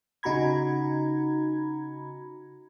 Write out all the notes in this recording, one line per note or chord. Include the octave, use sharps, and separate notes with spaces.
C#3 D#4 F#4 A#5 B5 G#6